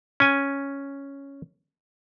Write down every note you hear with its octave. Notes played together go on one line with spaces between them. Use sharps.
C#4 G#5